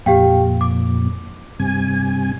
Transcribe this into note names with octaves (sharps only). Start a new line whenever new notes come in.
F2 A#2 G4 F5 G5
D6
G2 C3 G#5